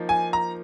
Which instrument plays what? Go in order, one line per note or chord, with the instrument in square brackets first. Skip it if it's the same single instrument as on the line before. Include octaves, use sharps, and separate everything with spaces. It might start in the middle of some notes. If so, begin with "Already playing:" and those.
Already playing: [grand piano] F3 A#3 D#4
[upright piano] G#5
A#5